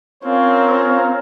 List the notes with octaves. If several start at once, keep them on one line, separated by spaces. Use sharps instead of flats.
C4 C#4 F4 A#4 C#5 F5